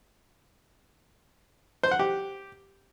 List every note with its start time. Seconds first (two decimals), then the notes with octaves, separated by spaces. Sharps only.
1.83 C5
1.91 F#5
1.99 G4